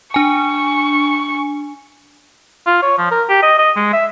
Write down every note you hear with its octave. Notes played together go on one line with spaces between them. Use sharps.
D4 G#5 C#6
F4
C#5
F3
A#4
G4
D#5
D#5
G#3
E5